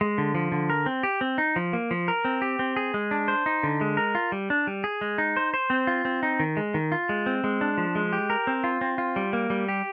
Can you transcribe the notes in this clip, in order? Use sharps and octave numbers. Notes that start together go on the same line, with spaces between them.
G#3
D3
F3
D3
A#4
C4
G4
C4
D#4
F3
A#3
F3
A#4
C4
G4
C4
G#4
G#3
D4
C5
D#4
D3
G#3
A#4
F4
G3
D4
G3
G#4
G#3
D#4
C5
C5
C4
F4
C4
D#4
D#3
G#3
D#3
F4
G#3
C4
G#3
D4
F3
G#3
G4
A#4
C4
F4
C4
F4
G3
A#3
G3
G4